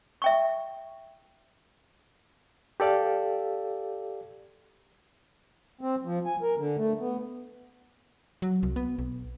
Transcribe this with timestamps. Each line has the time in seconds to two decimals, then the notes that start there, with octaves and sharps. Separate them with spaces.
0.22 E5 G5 C#6
2.80 G4 A4 D5 F5
5.81 C4
6.05 F3
6.26 G#5
6.42 A#4
6.58 D3
6.77 A3
7.00 B3
8.42 F#3
8.63 C2
8.76 B3
8.99 B1